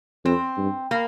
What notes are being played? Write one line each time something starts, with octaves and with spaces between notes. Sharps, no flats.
F2 C4
G2
A#3